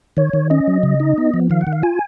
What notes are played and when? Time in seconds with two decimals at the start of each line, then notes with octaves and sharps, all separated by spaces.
0.17 D#3 C#5
0.33 D#3
0.50 C#4 D#5
0.67 F#3
0.83 C#3
1.00 D#4
1.18 B3
1.34 F3
1.50 D#3 F5
1.61 F#5
1.67 D#3
1.73 F5
1.83 F4 G#5